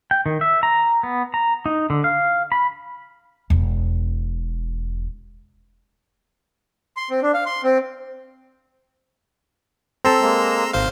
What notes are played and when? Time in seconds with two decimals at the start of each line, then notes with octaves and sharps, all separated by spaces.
0.11 G5
0.26 D#3
0.41 E5
0.63 A#5
1.03 B3
1.34 A#5
1.66 D#4
1.90 D3
2.04 F5
2.52 B5
3.50 E1 E2
6.97 C6
7.10 C4
7.22 D4
7.34 F5
7.46 C6
7.64 C4
10.05 C4 A4 A5 A#5 C6 E6
10.21 G#3 A#3
10.73 G#1 C5 F5